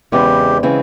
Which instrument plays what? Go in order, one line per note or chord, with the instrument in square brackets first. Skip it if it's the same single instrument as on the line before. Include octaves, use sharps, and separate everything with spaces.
[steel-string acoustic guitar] E2 C#3 E3 G#3 C4 [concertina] G4
[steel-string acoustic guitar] C#3 E3 G#3 C4